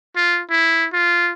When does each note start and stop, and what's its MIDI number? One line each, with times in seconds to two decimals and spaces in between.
0.16 0.42 65
0.50 0.87 64
0.93 1.33 65